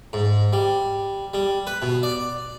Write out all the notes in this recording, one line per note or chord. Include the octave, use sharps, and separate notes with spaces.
G#2
G3
G3
B4
B2
D5